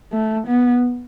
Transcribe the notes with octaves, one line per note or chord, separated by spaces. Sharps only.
A3
B3